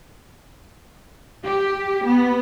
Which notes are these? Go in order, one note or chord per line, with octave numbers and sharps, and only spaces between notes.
G4
B3